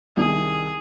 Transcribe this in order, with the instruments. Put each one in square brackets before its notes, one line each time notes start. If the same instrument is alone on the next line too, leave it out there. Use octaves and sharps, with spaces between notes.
[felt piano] C2 D#3 [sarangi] G#4